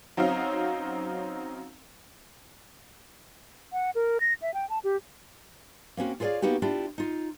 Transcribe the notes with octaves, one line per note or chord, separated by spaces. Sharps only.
F#3 C4 C#4 D#4 F5
F#5
A#4
A#6
E5
G5
A5
G4
A#3 C4 C#4 F#4
F4 G#4 A4 C#5 D5 F5
A#3 B3 D#4 F#4 G4
D4 E4 F4 G4
D#4 F4